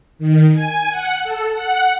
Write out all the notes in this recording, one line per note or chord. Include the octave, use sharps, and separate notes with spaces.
D#3
G#5
F#5
A4
F#5